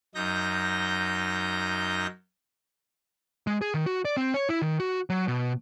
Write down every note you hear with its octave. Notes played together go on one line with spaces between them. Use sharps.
F#2 D#4 G6 A#6
G#3
G#4
D#3
F#4
D5
C4
C#5
E4
D#3
F#4
F#3
B2